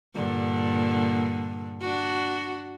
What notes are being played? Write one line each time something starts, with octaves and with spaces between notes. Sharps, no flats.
G2 A#2 D3
D4 F#4